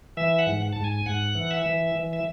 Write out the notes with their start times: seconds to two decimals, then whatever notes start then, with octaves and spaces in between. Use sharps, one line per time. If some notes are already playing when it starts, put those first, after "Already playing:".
0.17 E3 E5
0.39 F#5
0.47 G#2
0.72 G#2 A5
0.84 G#5
1.06 G#2 F#5
1.35 E3
1.51 E5
1.66 E3
1.95 E3
2.13 E5